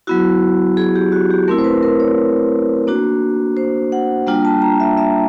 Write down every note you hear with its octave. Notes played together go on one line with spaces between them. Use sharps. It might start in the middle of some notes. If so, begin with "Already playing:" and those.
F#3 B3 E4 F#4
G#4
G4
F#4
G4
A3 C4 E4 A#4
C5
B4
A#4
C#5
A#3 D4 F#4
C5
F#5
G3 A#3 D4 F4 G5
A5
A#5
E5
E5